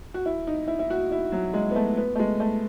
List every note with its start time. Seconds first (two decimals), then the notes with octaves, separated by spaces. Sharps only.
0.14 F#4
0.26 E4
0.47 D#4
0.68 E4
0.79 E4
0.90 F#4
1.12 E4
1.32 F#3
1.54 G#3
1.71 B3
1.76 A3
1.97 B3
2.15 A3
2.19 G#3
2.40 A3